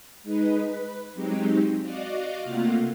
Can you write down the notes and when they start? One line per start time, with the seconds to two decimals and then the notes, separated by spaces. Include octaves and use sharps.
0.23 G#3 D#4 B4
0.60 B4
1.14 F#3 G#3 C4 D#4 G4
1.81 F#4 D5 D#5 F5 D6
2.40 C3 A3 A#3 F4 F5 F#5